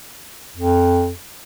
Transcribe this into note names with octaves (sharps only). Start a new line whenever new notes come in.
F2